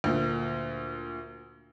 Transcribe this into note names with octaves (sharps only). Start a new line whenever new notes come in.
D2 A#2